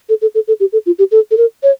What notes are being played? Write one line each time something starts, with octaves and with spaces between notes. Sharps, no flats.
A4
A4
A4
A4
G4
A4
F4
G4
A4
A4
A#4
C#5